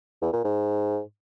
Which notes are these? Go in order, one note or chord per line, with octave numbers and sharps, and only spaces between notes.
E2
A#2
G#2